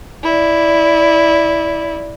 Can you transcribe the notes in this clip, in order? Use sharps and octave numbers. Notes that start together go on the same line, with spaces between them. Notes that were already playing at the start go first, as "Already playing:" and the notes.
E4 D5